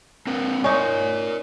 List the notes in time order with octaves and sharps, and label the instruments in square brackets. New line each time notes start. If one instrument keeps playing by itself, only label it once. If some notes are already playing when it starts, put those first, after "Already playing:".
[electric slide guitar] C4 A#4 B4
[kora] C#4 D#4 [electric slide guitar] A#4 D5